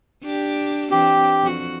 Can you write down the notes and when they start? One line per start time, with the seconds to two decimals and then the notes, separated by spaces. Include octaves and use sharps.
0.23 D4 G4
0.91 E3 C4 D4 G4
1.42 F2 F#4